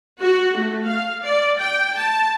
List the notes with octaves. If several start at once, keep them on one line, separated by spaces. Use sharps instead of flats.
F#4
A3
F5
D5
G5
A5